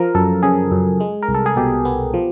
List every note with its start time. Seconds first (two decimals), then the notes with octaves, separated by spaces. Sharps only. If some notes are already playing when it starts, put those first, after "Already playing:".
Already playing: F3 A#4
0.15 F#2 A4
0.43 C#3 G#4
0.72 F#2
1.00 G#3
1.22 A#4
1.29 C2
1.34 A4
1.46 G#4
1.57 B2 G4
1.85 B3
2.14 F3